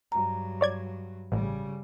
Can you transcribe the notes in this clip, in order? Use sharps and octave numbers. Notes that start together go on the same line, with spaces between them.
G2 F#3 A#5
C#5 D5 G#6
A1 C#3 G3